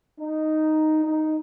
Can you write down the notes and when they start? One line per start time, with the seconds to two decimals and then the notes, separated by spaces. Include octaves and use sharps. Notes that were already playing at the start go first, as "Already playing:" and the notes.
0.19 D#4
1.05 D#4